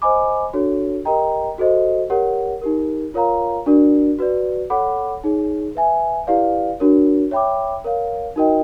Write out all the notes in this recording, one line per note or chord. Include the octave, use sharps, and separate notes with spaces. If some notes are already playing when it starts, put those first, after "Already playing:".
C5 D#5 G#5 B5 D6
D4 F#4 A4 C#5
G4 A#4 D#5 G5 A#5
F#4 A4 C5 D#5
G4 A#4 C#5 F#5
D#4 G4 A#4
F4 A#4 C#5 F5 A#5
D4 F#4 A#4 D5
F#4 B4 D5
A4 C#5 F#5 B5 D6
D#4 G#4 C#5
B4 E5 G#5
E4 G4 B4 D5 F5
D4 F#4 A#4 C#5
C#5 E5 G5 B5 D6
A#4 C#5 F5
D#4 F#4 A#4 D#5 G5